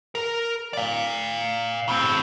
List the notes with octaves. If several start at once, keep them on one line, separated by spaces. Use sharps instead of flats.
A#4
D5 F5
A2 C4